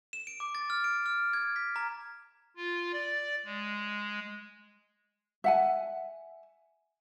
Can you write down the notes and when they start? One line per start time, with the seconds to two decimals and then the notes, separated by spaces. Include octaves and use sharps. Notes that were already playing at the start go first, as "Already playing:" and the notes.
0.13 E7
0.27 D7
0.40 D6
0.55 A6
0.70 F6
0.84 D7
1.06 F6
1.33 G#6
1.56 B6
1.76 A#5
2.56 F4
2.92 D5
3.45 G#3
5.44 E5 F#5 G#5